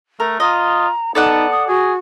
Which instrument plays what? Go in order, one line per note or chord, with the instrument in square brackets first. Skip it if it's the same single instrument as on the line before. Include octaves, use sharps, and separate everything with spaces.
[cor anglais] A3 [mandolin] A#4
[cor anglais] F4 [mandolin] D#5 [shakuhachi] A#5
[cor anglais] B3 [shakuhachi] D#4 [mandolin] A4 D5 F#5
[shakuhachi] D#6
[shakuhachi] F#4 [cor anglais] G#4